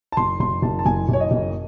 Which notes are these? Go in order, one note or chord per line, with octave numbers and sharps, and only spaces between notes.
A5
F#1 C6
F#1 C6
F#1 A5
A5
F#1 G#5
F#1 C#5
D#5
F#1